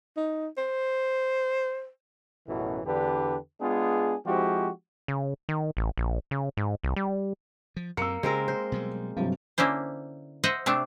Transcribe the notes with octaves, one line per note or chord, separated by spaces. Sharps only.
D#4
C5
A1 F#2 B2 E3 F#3
E2 D3 D4 G4 B4
G#3 B3 D4 F4 G#4
F3 G#3 C4 E4 F#4 G4
C#3
D#3
A1
A#1
C#3
G#2
C2
G3
F3
F#2 A#3 C4 E6 C#7
C#3 G#3 C4 A#4
C5
B2 F#3 G3
G2 C3 F3 F#3
D3 A#3 C#4 E4 C5
C5 D#5 E5 F#5
C3 A3 C4 D4